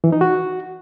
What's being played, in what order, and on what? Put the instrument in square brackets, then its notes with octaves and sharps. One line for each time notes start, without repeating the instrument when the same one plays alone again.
[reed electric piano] E3
D#4
F#4